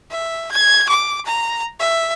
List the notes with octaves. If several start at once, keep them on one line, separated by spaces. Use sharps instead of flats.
E5
G#6
D6
A#5
E5